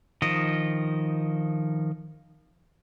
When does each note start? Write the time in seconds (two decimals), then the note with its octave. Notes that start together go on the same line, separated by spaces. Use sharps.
0.22 D#3 F3 D#5